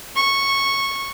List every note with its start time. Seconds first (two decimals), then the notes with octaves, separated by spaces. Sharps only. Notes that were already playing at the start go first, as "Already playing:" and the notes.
0.16 C#6